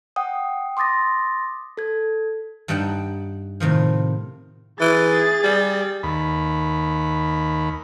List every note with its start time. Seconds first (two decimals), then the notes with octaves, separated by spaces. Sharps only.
0.16 F#5 G5 D#6
0.77 C6 D6 D#6 A6 A#6
1.77 A4 G#6
2.68 G2 G3 D#4 F#5 G5 A5
3.60 A2 C3 D#3 F3
4.81 E3 G#4 A6
5.43 G3
6.03 D#2 B5